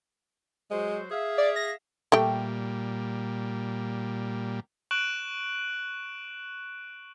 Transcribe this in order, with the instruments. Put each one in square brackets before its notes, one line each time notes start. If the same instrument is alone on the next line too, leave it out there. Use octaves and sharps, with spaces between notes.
[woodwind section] F#3 F#4 C5 [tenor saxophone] G#3
[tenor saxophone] G#4 [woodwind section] E5 F5
[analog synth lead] D5
A#6
[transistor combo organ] A#2 G3 [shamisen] A3 G4 G5
[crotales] C#6 F#6 D7 E7 F#7